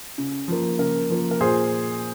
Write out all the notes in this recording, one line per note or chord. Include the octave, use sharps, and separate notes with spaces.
C#3
F3 A#3
C#3 A#4
F3 A#3
A#4
A#2 G#4 C5